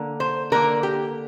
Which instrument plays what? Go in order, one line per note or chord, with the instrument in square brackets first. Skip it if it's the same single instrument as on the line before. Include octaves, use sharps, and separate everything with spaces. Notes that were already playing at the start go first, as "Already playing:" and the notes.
Already playing: [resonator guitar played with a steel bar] D3 A#3
C5
D3 A#3 A#4
G4